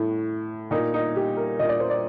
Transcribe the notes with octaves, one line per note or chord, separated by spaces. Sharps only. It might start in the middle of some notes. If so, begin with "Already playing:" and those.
Already playing: A2
A#2 D#4
D#4
G4
A#4
A#2 D#5
D5
C5
D5